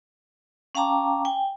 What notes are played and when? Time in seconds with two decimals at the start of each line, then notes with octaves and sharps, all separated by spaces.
0.75 C#4 F5 G5 A5 A#5 D6
1.25 G5 G#5